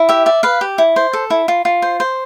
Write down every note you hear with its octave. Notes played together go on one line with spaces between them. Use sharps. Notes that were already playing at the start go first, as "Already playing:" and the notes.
Already playing: E4
G4 E5
D5 E5
B4 F5
G4
E4
C5
A4
E4
F4
F4
C5
C5